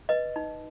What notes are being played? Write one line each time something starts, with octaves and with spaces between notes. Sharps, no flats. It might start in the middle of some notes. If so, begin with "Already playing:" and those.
B4 D#5
D#4